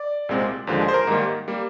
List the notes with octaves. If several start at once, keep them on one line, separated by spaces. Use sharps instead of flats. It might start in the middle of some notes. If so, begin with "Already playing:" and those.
Already playing: D5
C2 A#2 G#3 C4
D#2 D3 F3 G#3 C5
G#4
C5
A#4
G#2 D#3 G3 A#3
G3 A#3